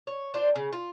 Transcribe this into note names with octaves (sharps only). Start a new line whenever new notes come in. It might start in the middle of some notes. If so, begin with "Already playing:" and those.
C#5
D4 F4 C5
C#3
F4